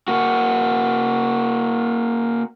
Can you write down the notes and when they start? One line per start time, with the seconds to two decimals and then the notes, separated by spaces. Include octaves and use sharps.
0.08 A#3 F#4